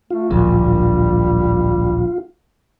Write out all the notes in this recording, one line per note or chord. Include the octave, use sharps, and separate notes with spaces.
A3 F4
D1 A#1 G3